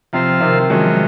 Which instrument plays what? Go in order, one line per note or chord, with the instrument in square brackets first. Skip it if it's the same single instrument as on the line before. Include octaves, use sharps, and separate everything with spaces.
[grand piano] C3 [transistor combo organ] F3 C4 F4 C5
[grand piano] C3 D#3
[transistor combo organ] D#3 F#3 C#4 [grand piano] F3 G#3